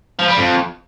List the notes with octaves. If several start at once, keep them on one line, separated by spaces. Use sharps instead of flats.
F3
G3
F2